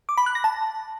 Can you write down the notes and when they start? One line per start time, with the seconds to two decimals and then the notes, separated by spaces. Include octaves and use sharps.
0.09 D6
0.18 B5
0.26 F#6
0.35 A#6
0.44 A5